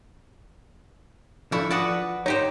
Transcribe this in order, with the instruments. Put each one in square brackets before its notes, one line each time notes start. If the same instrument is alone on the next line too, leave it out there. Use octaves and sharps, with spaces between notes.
[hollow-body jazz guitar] F3 D4 [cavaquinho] E4 A4 C#6
[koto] F#4 D5 [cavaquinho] B4 F#5 D#6
[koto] D#4 G4 C5 [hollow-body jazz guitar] C#5